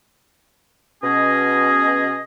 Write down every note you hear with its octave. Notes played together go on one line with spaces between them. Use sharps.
B2 C#4 G#4 D#5